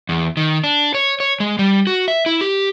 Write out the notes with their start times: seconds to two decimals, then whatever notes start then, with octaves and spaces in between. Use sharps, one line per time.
0.09 E2
0.37 D#3
0.64 D4
0.94 C#5
1.20 C#5
1.40 G#3
1.59 G3
1.87 F#4
2.08 E5
2.26 E4
2.41 G4